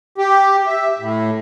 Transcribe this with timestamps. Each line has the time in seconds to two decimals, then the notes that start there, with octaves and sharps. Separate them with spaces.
0.18 G4
0.67 E5
0.99 A2